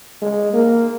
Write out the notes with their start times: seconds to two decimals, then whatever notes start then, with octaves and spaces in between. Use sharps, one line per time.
0.22 G#3
0.53 A#3